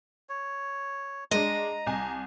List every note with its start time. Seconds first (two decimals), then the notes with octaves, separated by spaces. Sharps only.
0.29 C#5
1.31 G#3 D4 D#5 A#5
1.87 C2 G#5